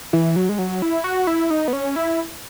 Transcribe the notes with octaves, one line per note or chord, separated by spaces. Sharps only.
E3
F#3
G#3
F#3
E4
F#4
E4
D#4
B3
C#4
E4